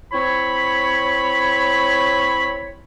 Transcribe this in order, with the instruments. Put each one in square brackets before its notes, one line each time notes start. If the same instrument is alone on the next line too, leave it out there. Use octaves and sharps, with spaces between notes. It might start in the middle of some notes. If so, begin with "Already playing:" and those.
[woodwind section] C4 E4 C#5 [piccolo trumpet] B5